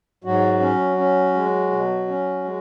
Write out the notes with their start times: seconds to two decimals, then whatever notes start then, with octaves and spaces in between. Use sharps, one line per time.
0.24 G#2 F#3 F#4
0.60 C#4
0.97 C#4
1.34 G#3
1.71 B2
2.08 C#4
2.45 G#3